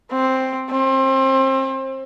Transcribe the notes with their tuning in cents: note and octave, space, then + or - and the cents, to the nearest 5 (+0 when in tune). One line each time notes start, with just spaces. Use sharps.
C4 +5
C4 +30